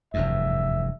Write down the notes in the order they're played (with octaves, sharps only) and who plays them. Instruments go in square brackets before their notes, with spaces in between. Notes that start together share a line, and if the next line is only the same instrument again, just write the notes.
[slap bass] F1 E2 G2 [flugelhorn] E5